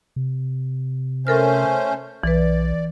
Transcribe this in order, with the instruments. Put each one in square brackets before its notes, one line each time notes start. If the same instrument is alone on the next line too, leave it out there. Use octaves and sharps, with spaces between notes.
[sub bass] C3
[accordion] A3 C#4 C5 [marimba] A4 A#4 F6
[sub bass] B1 [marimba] E3 B4 [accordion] D5